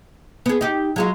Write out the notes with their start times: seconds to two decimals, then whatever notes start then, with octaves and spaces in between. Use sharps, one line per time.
0.46 B3 G#4
0.61 D#4 G4
0.96 F#3 G#3 F4